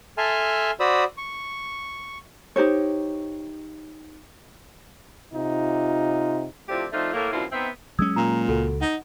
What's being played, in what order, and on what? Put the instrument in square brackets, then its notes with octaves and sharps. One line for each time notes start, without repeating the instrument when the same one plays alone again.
[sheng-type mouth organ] A4 E5 G#5 A5 C6 F6
F#4 C5 D5 B5 D#6 E6
C#6
[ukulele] D#4 G4 C5 C#5
[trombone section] C3 D#4 F4
[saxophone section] F3 A3 C4 D4 E4 G4
F3 A3 C4 D4 D#4 F4
A2 A#3
F#2 B2 D3 C4 E4 F4
B3 C4 D#4 C5 E5
[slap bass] F#3 G#3 C#4 [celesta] D#6 E6 G#6
[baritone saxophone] A#2 [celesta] A#5
[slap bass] C#2 [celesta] F#4 A4 F#5
[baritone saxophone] D#4 [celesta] F#5